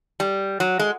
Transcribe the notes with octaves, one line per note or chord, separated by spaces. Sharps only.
G3
F#3
G#3